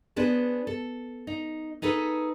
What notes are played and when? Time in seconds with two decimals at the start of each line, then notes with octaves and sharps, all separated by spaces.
0.16 B3 D4 G#4 C5
0.67 A4
1.27 D#4
1.82 D#4 G#4 A4 B4